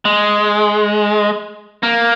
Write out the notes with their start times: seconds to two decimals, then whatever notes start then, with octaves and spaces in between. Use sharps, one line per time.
0.05 G#3
1.83 A#3